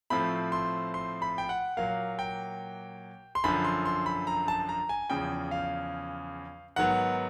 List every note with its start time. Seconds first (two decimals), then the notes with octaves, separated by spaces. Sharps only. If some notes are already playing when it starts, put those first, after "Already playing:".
0.10 A2 F3 A3 C4 B5
0.52 C6
0.94 C6
1.22 B5
1.38 G5
1.49 F#5
1.77 A#2 F#3 A#3 F5
2.19 G5
3.35 C6
3.44 F#2 D3 F3 B5
3.64 C6
3.85 C6
4.06 B5
4.27 A#5
4.48 A5
4.69 A#5
4.89 G#5
5.10 E2 C#3 F3 G5
5.51 F5
6.76 G#2 D#3 F#3 B3 F#5